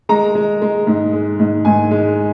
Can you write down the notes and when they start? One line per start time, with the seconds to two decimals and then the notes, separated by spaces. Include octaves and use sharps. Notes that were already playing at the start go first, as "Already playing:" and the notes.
0.09 G#3 A#5
0.35 G#3
0.62 G#3
0.87 G#2
1.13 G#3
1.39 G#2
1.65 G#2 G#5
1.91 G#3